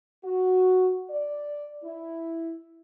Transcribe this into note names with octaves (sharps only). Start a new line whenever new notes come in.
F#4
D5
E4